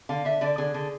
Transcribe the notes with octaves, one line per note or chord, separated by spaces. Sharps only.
D3 F5
D3 E5
D3 D5
D3 G#4
D3